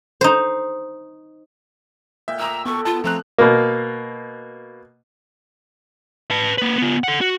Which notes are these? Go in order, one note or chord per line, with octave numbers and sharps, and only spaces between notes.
D#4 C5
A#2 D#5 E5 G5
A#2 D#5 A#5 D6 E6
B2 B3 A4 C#6
F4 A5
F3 A3 C4 A#5 F#6
B2 A#3
B4 A5
A#3 B4
B3 F4
A4 F#5
F#4